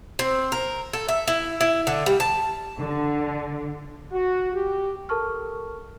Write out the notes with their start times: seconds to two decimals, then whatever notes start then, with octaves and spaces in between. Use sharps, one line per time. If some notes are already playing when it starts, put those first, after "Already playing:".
0.19 C4
0.52 A#4
0.93 A4
1.09 E5
1.28 E4
1.61 E4
1.87 D3
2.06 G3
2.20 A5
2.78 D3
4.12 F#4
4.54 G4
5.09 A4 A#4 A5 C#6 F6